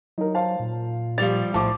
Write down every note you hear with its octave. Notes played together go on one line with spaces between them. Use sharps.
F#3 D#4 A#4
C5 F5 A5
A#2
F3 G3 D5 A6 F7
A#1 A2 F3 A5 D6